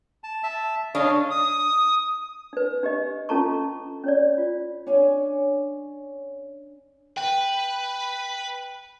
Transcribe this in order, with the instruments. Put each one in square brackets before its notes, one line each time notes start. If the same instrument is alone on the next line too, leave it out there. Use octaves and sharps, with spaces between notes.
[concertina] A5
E5 A5
[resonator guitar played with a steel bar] D4 [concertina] C#5 D#5 F5
[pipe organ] D#6
[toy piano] D4 B4
D4 G4 D#5
C#4 F4 A4 A5 A#5 C#6
C#4 C#5 D5
F4
[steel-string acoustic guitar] C#4 D4 C#5 G#5
[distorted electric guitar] B4 [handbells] G5